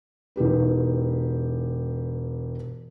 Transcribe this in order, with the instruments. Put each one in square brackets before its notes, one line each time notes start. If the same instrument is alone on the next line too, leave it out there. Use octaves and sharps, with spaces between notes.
[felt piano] E1 D#4 G4 B4